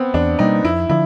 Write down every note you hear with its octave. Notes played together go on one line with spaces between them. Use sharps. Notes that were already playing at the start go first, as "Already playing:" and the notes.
Already playing: B3 C4
E2 D4
B2 G3 A#3 D#4
F2 E4
D3 F3 E4